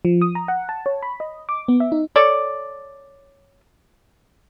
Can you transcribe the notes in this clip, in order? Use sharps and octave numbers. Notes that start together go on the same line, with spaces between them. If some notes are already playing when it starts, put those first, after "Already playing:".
F3
D#6
A#5
F#5
A5
C#5
B5
D#5
D6
B3
E5
D#4
A4 C#5 D5